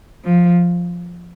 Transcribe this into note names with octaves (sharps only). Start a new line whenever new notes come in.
F3